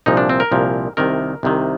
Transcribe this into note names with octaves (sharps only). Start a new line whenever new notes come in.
C2 A#2 F3 D#4
D4
C4
A#4
C2 A#2 F3
C2 C3 D#3 A#4
C2 C3 D#3